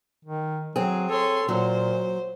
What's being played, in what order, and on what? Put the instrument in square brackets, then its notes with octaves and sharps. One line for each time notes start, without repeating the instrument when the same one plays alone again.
[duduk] D#3
[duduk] F#3 [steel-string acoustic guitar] C4 G#4
[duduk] A4 [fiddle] C#5 C6
[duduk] A#2 [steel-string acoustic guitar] F#3 [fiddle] C5